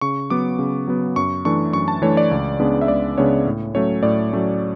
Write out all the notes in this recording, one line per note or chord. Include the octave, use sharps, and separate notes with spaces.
C#3 C#6
F#3 B3 D6
C#3
F#3 B3
F#2 C#6
E3 A3 D4 C#6
F#2 C#6
A5
E3 A3 D4 C#5
D5
C#2
C#3 G#3 B3 D4
E5
C#2 D5
C#3 G#3 B3 D4 C#5
A2
F#3 A3 C#4 C#5
A2 D5
F#3 A3 C#4